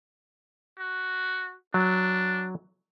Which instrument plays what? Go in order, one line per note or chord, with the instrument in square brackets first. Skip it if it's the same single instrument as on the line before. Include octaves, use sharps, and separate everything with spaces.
[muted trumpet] F#4
[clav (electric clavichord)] F#3 [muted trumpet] D4